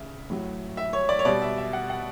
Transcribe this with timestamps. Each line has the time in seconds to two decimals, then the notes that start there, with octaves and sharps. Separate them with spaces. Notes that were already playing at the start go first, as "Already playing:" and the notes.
Already playing: C#3 E5
0.30 A2 F#3
0.77 E5
0.93 C#5
1.09 D5
1.19 C#5
1.25 B2 G3 D5
1.42 E5
1.58 E5
1.73 F#5
1.90 F#5